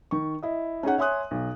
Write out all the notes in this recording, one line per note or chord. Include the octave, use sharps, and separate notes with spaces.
D#3 C#6
E4 D#5
C#4 D#4 G#4 F#5
C#5 E5 G#5 C6 D#6 F#6
B1